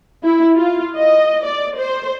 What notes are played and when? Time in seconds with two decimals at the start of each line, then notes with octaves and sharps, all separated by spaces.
0.23 E4
0.56 F4
0.96 D#5
1.44 D5
1.77 C5